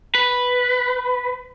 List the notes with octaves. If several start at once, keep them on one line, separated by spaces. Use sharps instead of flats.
B4